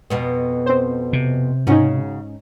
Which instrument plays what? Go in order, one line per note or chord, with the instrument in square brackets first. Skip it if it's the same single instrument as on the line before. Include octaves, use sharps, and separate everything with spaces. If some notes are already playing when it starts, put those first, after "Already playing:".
[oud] F2 B2 B3
[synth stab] C4 C5
[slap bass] C3
[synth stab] G#2 C#4 D#4 [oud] C#3 F#4